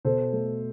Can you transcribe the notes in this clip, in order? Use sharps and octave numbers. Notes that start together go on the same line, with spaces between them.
B2 A4 C5
A3